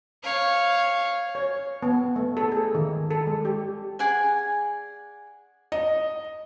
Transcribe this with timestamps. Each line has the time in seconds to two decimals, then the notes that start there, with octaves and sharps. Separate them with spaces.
0.24 C#5 F5
1.35 C#5
1.83 B3
2.16 A3
2.37 A4
2.52 G#4
2.75 D#3
3.11 A4
3.27 G#3
3.45 G4
3.99 G#4 D5 F#5 G#5
5.72 D#5